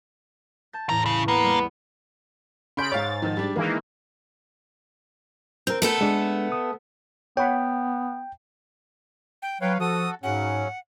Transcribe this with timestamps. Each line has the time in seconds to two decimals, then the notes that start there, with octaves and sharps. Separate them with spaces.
0.73 A5 G6 A6
0.89 A1 E2 A2 D3 A#5
1.06 C#3
1.28 A#3 B3
1.43 G3
2.77 C#3 B5 C6 G6 D7
2.92 G#2 C#5 F5 A6
3.22 D#3 F3
3.37 G3 D4
3.56 D#3 E3 G#3 A#3
5.67 C4 A#4 G6
5.82 A3 B3 A4
6.01 G#3 D4
6.52 D#6
7.37 B3 C#5 F#5 G5 B5
9.42 G5
9.61 F#3 B4 C#5 F5 G5
9.80 F3 F#4 A4 D#6
10.23 G#2 C#3 F#3 C#4 F#5